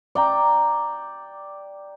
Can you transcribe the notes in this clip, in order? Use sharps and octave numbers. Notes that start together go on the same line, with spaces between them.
D5 G5 A#5